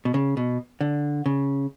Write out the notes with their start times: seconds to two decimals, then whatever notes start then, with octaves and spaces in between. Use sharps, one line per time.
0.05 B2
0.14 C#3
0.37 B2
0.81 D3
1.26 C#3